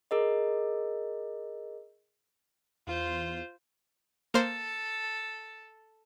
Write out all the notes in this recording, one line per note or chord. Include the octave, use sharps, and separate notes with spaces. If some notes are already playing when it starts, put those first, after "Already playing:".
G#4 A#4 D#5
E2 F4 C5
A#3 A4 C5